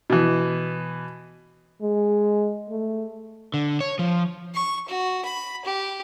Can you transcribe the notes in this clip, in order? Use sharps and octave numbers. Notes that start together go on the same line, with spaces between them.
B2 E3
G#3
A3
D3
C#5
F3
C#6
F#4
B5
G4